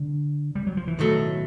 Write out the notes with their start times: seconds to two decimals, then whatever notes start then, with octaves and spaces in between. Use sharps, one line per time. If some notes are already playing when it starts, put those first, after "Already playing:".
Already playing: D3
0.55 G3
0.67 F#3
0.77 F3
0.88 E3
0.98 B1 A2 D#3 F#3 A3